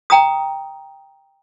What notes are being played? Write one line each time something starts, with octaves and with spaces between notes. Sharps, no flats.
G5 A#5 D#6